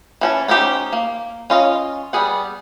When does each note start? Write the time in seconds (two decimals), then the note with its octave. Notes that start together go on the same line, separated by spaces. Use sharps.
0.21 E3 C#4 A5
0.48 C#4 D#4 E4 G4 C5
0.93 A#3
1.50 C#4 F4 D#5
2.13 G3 B3 G#4 F#5